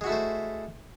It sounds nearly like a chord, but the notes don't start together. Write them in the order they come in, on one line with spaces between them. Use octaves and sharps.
G#3 F#4 E4 A3 C5